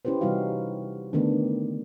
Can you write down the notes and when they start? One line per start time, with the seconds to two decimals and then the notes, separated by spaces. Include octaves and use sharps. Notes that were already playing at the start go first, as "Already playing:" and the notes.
0.05 C#4 E4 G4 B4 C5
0.21 C3 E3 G3 D#4 F#4 F5
1.13 D3 D#3 A3 B3 D4